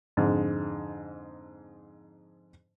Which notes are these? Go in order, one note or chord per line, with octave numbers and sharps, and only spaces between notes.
F2 G#2 D3